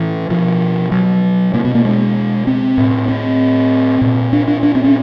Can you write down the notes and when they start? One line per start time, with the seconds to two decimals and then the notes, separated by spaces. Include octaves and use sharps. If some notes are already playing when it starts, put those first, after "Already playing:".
Already playing: A2 E3
0.30 B2 F3
0.91 F#3
1.54 B2 A#3
1.64 B3
1.75 A#3
1.85 G#3
2.47 C4
2.78 A2
3.08 C4
4.02 A#2
4.33 D4
4.48 D4
4.63 D4
4.75 C4
4.84 C#4